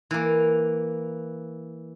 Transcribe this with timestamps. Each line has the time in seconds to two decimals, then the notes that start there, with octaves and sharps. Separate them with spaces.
0.11 E3 A#3